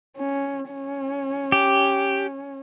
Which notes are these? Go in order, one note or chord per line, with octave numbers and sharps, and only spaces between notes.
C#4
C#4
G4